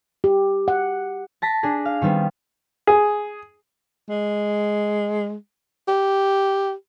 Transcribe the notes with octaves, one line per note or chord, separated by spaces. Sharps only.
G4
F#5
A5 A#6 B6
D4 G#4
F5
D#3 G3 B3 C4
G#4
G#3
G4